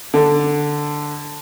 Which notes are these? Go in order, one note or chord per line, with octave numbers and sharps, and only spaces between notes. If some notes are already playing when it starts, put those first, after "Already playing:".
D3